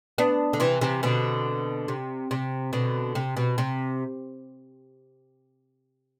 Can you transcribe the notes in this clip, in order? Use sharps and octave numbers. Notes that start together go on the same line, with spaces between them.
B3 D4
D3
C3 E3
C3 E3
B2 D3
C3
C3
B2 D3
C3
B2
C3